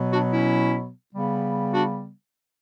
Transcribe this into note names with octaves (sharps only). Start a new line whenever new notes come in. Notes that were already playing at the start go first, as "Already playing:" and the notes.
Already playing: B2 F#3 B3
D4 F#4
C#4 E4
C#3 G3 B3
D4 F#4